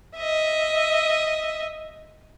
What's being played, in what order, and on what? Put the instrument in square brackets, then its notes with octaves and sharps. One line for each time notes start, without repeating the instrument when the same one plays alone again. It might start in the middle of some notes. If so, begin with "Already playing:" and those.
[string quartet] D#5 E5